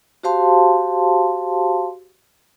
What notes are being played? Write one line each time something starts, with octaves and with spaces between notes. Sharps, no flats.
F#4 G4 C5 F5 A5 C6